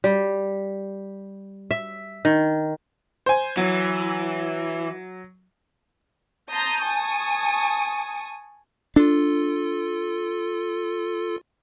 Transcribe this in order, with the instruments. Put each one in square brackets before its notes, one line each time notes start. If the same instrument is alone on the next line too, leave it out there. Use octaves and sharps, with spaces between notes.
[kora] G3
E5
D#3
[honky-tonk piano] C5 G#5
[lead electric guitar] E3 [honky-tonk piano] F#3
[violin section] A5 A#5 C6 D#6 G6
G#5 A5 C#6 D#6
[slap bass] D4 [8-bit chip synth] F4 A4